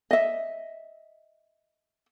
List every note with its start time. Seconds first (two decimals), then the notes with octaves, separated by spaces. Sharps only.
0.11 D#5 E5